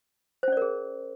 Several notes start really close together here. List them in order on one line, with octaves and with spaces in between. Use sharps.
C5 C#4 D5 A#4 G#4